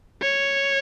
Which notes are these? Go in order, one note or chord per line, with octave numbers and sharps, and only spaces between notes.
C#5